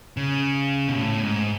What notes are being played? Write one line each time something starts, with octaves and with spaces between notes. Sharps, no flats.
C#3
B2
A2
G#2